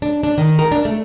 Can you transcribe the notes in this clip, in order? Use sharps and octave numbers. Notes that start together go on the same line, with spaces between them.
D4
D4
D#3
A#4
D4
A3